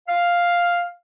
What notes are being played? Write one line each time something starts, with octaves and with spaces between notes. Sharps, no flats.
F5